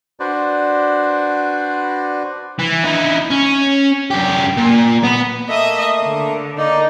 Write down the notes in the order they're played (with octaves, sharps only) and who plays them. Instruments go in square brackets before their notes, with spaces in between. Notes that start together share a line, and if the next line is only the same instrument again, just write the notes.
[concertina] D4 F#4 B4 C5 D5
[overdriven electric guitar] E3
D#4 E4
C#4
F#2 G4
A#2
B3 B4
[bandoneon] A3 A#3 [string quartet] D#5 E5 D#6
[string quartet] D3
[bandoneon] A#3 D5 [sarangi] D#4